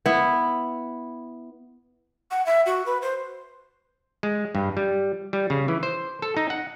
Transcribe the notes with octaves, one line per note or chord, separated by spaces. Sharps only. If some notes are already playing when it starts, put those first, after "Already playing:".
B3 E4
F#5
E5
F#4
B4
C5
G#3
G2
G3
G3
C#3
E3
C5
A4
D#4
F#5